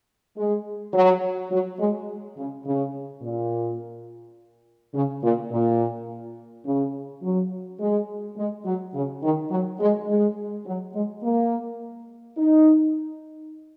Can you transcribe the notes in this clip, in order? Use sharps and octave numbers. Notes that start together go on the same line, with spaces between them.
G#3
F#3
F#3
G#3
C#3
C#3
A#2
C#3
A#2
A#2
C#3
F#3
G#3
G#3
F#3
C#3
D#3
F#3
G#3
G#3
F#3
G#3
A#3
D#4